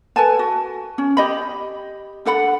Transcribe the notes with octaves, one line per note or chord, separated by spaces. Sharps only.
A4 B4 G#5 A5
F#4
C#4
G4 D#5 B5
D4 A4 F#5 B5